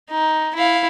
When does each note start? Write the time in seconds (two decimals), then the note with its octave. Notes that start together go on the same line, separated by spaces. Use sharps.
0.11 D#4
0.55 E4 F5